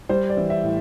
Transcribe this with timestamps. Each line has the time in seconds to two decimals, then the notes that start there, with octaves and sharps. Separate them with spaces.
0.09 G3 C5
0.30 D5
0.37 E3
0.50 E5
0.64 A2